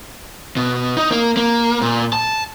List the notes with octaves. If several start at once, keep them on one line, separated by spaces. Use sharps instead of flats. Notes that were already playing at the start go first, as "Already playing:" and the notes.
B2
D#4
A#3
A#3
A#2
A5